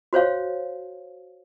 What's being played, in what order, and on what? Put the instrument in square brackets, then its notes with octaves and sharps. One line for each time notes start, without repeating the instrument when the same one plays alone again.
[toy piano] F#4 C5 C#5 F5